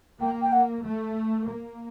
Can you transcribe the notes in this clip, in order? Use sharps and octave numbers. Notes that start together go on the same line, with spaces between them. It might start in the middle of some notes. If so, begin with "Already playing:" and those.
A#3 G5
G5
F#5
A3
A#3